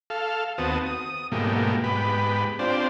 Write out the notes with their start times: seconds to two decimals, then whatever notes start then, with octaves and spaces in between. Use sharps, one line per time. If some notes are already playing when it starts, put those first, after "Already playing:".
0.10 A4 F5
0.58 D#2 B3 C4 F#4 A5 D#6
0.86 D#6
1.32 G#2 B2 F#3 A3 A#3 G4
1.84 G#2 B3 G4 B5
2.59 C4 D4 F4 G4 C5 D5